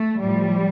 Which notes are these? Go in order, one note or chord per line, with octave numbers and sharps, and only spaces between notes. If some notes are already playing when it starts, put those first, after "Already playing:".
Already playing: A3
A2 F3 G3